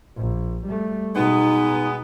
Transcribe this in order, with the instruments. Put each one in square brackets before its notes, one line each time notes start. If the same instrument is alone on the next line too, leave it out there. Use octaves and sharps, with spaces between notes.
[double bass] A#1
G3 A3
[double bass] B2 [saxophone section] G#3 B3 [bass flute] D#4